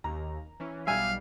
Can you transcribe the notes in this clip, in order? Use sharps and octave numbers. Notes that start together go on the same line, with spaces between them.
D#2 A#5
E3 C#4
B1 G3 E5 F5 G#5